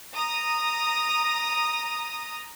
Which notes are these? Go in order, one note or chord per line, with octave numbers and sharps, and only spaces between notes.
A#5 D#6